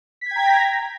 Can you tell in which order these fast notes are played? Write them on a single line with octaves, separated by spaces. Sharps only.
B6 G#6 G5 A#5 A#6